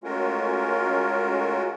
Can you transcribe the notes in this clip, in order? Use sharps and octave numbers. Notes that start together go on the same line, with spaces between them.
G#3 A3 C#4 F4 F#4 A#4